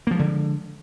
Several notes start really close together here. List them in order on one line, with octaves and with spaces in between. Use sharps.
A#3 F3 G#3 D3